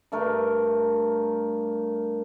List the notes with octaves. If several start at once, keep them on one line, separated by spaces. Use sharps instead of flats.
G2 A3 A#4